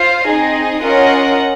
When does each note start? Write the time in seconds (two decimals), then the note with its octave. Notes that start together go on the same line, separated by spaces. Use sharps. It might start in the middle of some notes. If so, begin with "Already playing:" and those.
Already playing: F4 C5 F5
0.28 C4 D#4 G#4 D#5
0.82 C#4 F4 A#4 D#5 F#5